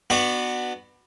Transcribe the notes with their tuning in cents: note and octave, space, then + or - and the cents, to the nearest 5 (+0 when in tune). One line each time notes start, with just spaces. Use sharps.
B3 +0 D4 +30 F#4 +0